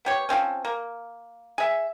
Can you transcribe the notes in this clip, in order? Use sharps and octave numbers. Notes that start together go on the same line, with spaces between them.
B3 G4 C#5
F3 G#3 C4 C#4
A#3
G#4 E5